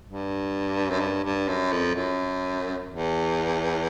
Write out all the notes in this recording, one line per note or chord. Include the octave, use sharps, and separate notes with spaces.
G2
F#2
G2
G2
F#2
F2
F#2
E2